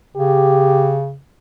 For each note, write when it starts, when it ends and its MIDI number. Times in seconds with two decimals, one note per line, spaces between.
0.16 1.16 49
0.16 0.97 67